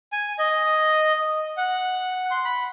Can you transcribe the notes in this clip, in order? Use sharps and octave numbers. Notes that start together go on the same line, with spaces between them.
G#5
D#5
F#5
C6
B5